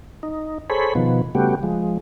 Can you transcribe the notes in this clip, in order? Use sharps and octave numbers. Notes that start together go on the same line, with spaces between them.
D#4
G#4 A4 C5 C#5 B5
B2 D#3 F3 B3
C#3 G3 A3 B3 F#4 G4
F3 G#3